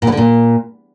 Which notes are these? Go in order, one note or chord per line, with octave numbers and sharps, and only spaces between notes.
A#2
E3
D3
A#2